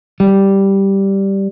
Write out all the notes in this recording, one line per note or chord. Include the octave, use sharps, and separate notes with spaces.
G3